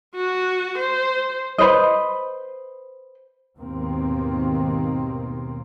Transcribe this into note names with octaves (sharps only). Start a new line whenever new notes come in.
F#4
C5
B4 C5 D#5
D#2 G#2 B2 D#3 A#3 C4